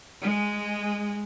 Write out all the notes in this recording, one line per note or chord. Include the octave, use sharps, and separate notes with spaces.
G#3